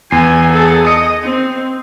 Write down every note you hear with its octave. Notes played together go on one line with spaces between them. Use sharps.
E2 G#5 C7
G#4 A4
D#5 D#6 C#7
C4